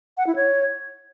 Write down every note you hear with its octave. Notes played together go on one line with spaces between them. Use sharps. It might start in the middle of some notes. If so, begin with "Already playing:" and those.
F#5
E4
C#5